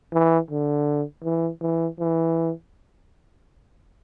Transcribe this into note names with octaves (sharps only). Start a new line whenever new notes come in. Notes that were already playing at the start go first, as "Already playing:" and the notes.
E3
D3
E3
E3
E3